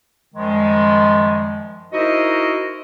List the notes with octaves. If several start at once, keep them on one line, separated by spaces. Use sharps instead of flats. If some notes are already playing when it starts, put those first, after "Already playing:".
F#2 D#3 F3 G3 G#3
D#4 E4 F#4 A#4 C5 D#5